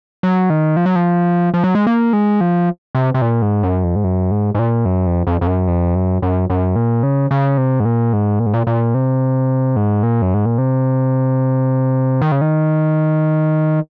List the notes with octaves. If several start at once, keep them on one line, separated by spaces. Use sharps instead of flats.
F#3
D#3
F3
F#3
F3
F3
F#3
G#3
A#3
G#3
F3
C3
C3
A#2
G#2
F#2
F2
G#2
F#2
G#2
G#2
A#2
F#2
F2
F2
F2
F#2
F2
F#2
F#2
F#2
A#2
C#3
C#3
C3
G#2
A#2
G#2
A#2
G#2
A#2
A#2
C3
G#2
A#2
F#2
G#2
A#2
C3
D#3
C#3
D#3